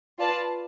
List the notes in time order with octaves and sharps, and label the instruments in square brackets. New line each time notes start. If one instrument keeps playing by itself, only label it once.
[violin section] F4 B4 D5 A5